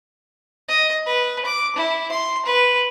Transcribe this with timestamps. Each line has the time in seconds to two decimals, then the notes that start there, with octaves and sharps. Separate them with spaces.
0.68 D#5
1.06 B4
1.45 D6
1.76 E4
2.12 C6
2.46 B4